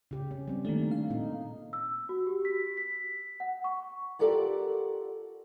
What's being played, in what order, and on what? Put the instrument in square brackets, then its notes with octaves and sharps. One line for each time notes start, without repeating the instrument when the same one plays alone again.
[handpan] C#3 G4
C#4
G3 C4
[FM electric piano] D#3 A#3 D4 [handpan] A3
[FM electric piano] F5
[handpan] A#2 C4 D#4
[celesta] E6
F#4
G4
B6
B6
F#5
C#6
[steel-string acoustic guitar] F4 G4 A4 A#4 D5 F#5